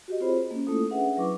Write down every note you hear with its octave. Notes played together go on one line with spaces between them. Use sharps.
F#4 G4 D#5
C4 F4 G#4 C5 C#5 B5
A#3 C#4
A3 A#3 E4 F4 A4 D#6
C#4 D4 G#4 B4 E5 F#5
F#3 E4 B4 C#6 D6